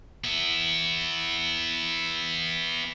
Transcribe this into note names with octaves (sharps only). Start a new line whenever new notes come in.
B3 E4